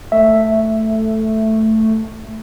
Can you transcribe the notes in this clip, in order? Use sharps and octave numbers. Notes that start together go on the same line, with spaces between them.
A3 E5